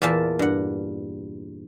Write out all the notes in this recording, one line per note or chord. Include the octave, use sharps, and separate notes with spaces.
E2 A#2 A#3 E5 A5
G2 F#5